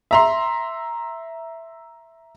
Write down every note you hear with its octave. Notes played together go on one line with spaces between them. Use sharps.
E5 A#5 C6